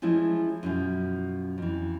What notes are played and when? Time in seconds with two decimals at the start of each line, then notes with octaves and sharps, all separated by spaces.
0.02 E3 F3 G#3 C#4 E4
0.63 F#2 B2 F3
1.58 F2 E3